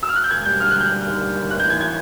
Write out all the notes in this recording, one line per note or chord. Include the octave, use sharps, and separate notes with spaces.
E6
F6
F#6
G6
E1 G#6
G3 G6
D3 F6
F#6
G3
G6
G3
D#2
G3
D#2
A1 F#6
G6
E3 G#6
G#6